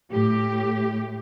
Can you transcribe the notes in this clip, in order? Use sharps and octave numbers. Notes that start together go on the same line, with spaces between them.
A2 G4